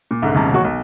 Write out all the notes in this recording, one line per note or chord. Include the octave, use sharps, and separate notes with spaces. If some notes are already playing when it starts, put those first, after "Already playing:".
A#2
C2 G#2 D3
D#1 C2 G#2 C#3 A5 A#5
E1 D#2 F#3 F#4 C#6
B1